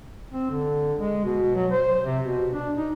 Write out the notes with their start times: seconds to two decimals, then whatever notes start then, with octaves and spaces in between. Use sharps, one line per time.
0.33 C4
0.51 D3
0.99 G#3
1.25 B2
1.55 F#3
1.72 C5
2.04 C3
2.24 B2
2.51 D4
2.77 D#4